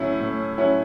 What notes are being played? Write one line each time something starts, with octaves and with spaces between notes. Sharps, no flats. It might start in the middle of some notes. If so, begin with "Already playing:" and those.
Already playing: A2 F#3 C#4 E4
A2
F#3 C#4 E4